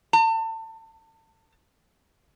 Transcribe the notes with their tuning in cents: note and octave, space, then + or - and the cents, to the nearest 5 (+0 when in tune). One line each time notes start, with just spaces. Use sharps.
A5 +30